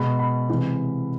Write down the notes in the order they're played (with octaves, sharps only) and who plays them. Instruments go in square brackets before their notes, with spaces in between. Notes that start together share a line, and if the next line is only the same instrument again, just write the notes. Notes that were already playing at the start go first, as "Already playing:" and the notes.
Already playing: [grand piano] B2 G#3 B5
B5
C3 E3 G#3